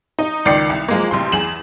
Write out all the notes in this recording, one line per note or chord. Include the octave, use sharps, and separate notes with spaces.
D#4
C#2 D#3 D5 C7 C#7
C2
F3 G#3 A#3
A1 C3 C6
E2 G#4 E7 F#7